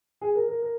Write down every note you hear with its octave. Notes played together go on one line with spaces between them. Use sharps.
G#4
A#4
A#4
A#4